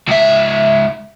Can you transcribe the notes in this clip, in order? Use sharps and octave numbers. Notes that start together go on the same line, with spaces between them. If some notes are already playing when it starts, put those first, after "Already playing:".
C#2 E5